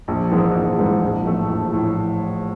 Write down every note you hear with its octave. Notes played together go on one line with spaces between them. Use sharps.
A#1
G#2 E3 G#3
A#1
G#2 E3 G#3
A#1
A2 E3 A3
A#1
A2